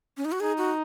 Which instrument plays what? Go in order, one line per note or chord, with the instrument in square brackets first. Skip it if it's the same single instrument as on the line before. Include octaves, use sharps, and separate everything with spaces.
[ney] C#4
D#4
F#4
[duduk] D#4 [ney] G#4
[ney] F#4